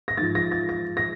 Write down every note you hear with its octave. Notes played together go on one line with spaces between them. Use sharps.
A#6
G#2 F3 A6
A#6
A6
A#6
A#6